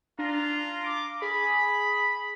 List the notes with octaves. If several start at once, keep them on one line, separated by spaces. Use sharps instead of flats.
D4 F4 A#5
D6
G#4 B5